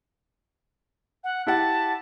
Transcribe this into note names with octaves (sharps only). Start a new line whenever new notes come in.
F#5
E4 G4 F#5 A5